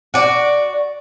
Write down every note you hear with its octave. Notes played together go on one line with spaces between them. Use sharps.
F#4 D5